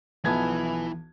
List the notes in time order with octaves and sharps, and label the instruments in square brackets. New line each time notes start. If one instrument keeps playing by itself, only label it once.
[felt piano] B1 B3 E4 [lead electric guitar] E3 G#5 [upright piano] F3 A5 G#6